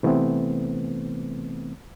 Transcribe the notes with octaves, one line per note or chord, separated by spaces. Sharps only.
C3 E3 A3 B3 C4